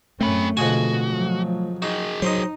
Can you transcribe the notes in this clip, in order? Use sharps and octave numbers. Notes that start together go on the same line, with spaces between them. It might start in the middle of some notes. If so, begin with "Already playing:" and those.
F#2 A3 C4 C#4 B5
F2 B2 D3 G#3 F#4 G#5
F3 F#3
D#4 F#4 G#4
F#3 D#4 C5 D#5